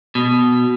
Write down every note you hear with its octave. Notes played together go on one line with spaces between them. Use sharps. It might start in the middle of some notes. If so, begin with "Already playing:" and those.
B2